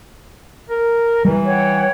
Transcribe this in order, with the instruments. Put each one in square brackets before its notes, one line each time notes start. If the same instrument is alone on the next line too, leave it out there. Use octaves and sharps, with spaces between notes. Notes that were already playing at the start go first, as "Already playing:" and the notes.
[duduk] A#4
[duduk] E3 [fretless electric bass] G3
[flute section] C#5 F#5 G5